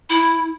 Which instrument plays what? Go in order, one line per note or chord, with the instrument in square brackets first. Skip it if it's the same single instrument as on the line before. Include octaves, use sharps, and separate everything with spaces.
[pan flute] E4